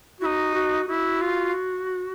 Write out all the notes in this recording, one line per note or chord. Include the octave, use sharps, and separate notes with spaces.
D#4 E4 F#4
F#4
E4 F#4
F4